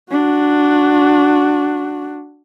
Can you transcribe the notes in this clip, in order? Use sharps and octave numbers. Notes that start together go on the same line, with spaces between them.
D4 F#4